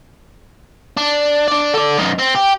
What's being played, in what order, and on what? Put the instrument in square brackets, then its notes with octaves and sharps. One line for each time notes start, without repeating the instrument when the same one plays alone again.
[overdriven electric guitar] D4
D4 D5
A4 D5
F#2 D#4
C4
G4